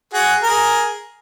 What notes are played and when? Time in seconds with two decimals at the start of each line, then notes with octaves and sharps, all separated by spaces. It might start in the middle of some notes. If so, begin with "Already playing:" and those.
0.14 F#4 G#4
0.43 G#4 A#4